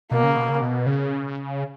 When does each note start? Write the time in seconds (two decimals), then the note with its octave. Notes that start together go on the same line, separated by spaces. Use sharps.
0.11 B2 A#3
0.24 C#3
0.36 B2
0.49 C#3
0.61 B2
0.86 C#3